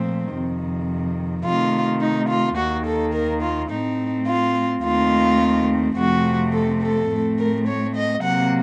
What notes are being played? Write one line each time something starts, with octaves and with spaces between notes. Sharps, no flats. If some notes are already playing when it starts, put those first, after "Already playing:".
Already playing: A#2 F3 A3 C4
F2 C3 D#3
C3 D#3 A3 F4
D#4
F4
D#2 D#3 A#3 F#4
A4
A#4
F4
A2 A3 C4 D#4
F4
D#2 D#3 A3 C4 F4
F2 C3 F3 A3 C4 F#4
A4
A4
A2 A3 C4
A#4
C#5
D#5
C3 F#3 A#3 F#5